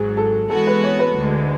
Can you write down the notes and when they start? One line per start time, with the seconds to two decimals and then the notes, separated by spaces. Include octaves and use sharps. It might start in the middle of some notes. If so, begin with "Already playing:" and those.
Already playing: G#1 G#2 F#3 G#4
0.17 A4
0.50 E3 G#3 B3 F#4 A4
0.67 B4
0.84 C#5
0.99 B4
1.16 D2 D3 G#3